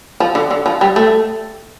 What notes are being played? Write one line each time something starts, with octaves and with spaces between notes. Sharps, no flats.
F3
D3
D3
F3
G3
A3